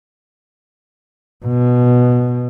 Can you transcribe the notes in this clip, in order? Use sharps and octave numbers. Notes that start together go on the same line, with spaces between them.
B2